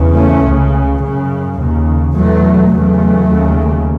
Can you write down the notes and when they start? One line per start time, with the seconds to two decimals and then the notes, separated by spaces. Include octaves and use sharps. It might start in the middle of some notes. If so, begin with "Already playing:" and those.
Already playing: E2 C#3
0.15 A3 C#4
0.44 C#2 C#3
1.01 F#2 C#3
1.59 D#2 C#3
2.15 E2 B2 F#3 A3
2.72 E2 C#3 F#3 A3
3.29 D#2 C#3